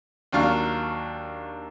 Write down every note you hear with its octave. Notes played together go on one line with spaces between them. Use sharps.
D#2 F#3 D4 F5 C#6 F6